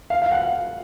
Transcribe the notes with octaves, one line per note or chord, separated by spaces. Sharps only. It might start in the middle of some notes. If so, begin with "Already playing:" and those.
F5
F5
F#5